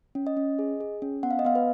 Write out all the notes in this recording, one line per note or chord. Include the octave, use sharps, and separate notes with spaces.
C#4
D#5
C#4
G#4
G#4
C#4
B3 F#5
F5
D#5
B3 F5
B4